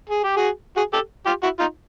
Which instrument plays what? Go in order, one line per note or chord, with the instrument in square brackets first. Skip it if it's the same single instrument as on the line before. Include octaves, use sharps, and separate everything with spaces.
[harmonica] G#4
G4
F#4 G#4
F#4 G#4
G4 A4
F4 G4
E4 F#4
D#4 F4